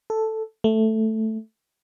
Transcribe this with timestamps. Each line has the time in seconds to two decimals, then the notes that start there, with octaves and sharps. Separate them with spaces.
0.10 A4
0.64 A3